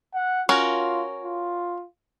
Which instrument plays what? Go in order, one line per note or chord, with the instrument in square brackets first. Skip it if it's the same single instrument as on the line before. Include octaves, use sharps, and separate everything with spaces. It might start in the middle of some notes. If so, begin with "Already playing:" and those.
[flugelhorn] F#5
[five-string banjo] C#4 F#4 A#4 [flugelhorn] F4
[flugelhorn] F4